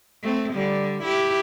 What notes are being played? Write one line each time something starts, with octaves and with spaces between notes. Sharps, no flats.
A3 C4
D3 G3
E4 G4